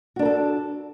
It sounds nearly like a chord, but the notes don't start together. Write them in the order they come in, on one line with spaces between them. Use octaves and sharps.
F#4 D4 A#4 A4